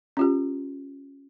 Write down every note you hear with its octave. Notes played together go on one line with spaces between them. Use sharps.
C#4 F4 G4